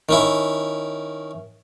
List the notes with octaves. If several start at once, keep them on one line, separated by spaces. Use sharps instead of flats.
D#3 C#4 E4